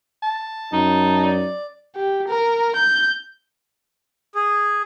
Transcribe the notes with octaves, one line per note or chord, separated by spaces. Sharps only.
A5
F#2 D#4
D5
G4
A#4
G6
G#4